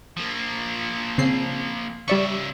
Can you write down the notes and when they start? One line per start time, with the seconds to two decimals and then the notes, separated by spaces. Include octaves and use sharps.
0.17 F3 A#3
1.18 C#3 C4 C7
2.08 C#3 G3 D5 E5 C#6